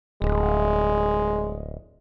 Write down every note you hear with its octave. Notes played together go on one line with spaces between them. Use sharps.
D1 G#3